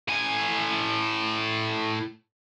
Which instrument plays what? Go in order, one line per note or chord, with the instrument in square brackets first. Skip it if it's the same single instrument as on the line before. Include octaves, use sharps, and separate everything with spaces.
[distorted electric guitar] A2 G#5